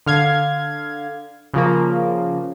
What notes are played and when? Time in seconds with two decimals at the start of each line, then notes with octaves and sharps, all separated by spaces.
0.06 D3 F5 G#6
1.54 C#3 F3 A#3